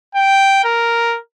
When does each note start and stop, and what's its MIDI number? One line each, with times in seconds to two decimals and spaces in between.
0.15 0.63 79
0.64 1.17 70